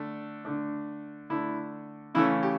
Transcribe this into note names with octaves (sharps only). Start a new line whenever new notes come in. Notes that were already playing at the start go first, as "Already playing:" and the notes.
Already playing: D3 A3 D4
D3 A3 D4
D3 A3 D4 E4
C#3 E3 A3 C#4 E4
G4